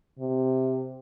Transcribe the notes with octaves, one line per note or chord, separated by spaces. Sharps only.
C3